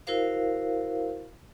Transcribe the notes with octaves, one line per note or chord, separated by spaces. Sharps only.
E4 F#4 A#4 C5 F5